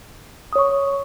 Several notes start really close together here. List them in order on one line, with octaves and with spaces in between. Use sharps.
D#6 C#5 C#6